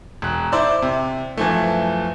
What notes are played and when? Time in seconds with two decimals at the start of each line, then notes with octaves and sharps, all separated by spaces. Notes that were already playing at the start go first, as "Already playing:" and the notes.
0.22 E1 F#6
0.52 E4 C5 D5 C6 E6
0.82 C3
1.37 F#2 E3 F3 A3